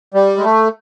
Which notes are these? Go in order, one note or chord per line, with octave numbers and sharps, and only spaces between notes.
G3
G#3
A3